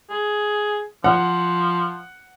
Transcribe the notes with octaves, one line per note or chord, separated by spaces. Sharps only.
G#4
F3 F#5